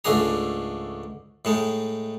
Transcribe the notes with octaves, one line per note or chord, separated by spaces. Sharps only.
C#2 G#2 A3 D4 G#4 A#5
A2 G#3 D#4